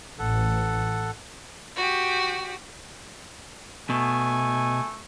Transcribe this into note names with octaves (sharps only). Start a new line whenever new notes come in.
A1 A4 F#5
F#4 G4
B2 A3 G#5